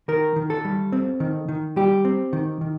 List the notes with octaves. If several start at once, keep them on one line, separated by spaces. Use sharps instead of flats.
D#3 A#4
D#3
A4
G3
C4
D#3
D#3
G3 G4
C4
D#3
D#3